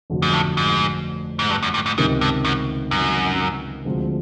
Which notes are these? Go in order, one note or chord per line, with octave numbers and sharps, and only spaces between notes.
G1 F2 D3 F#3 A3
G#2
A2
G#2
G#2
G2
F#2
G2
G#2
C#2 G#2 C3 D#3
G2
F#2
F#2
D2 D3 F3 G#3 C4